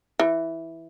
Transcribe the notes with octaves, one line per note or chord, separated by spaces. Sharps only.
E3